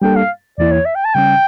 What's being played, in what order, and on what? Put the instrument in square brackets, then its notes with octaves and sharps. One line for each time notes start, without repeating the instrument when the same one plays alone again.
[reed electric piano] G3 A#3 D4 A4 [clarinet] G5
[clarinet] F5
[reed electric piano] E2 E3 A#3 E4 [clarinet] D5
[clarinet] C#5
E5
G5
A5
[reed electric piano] C#3 G3 C#4 [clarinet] G5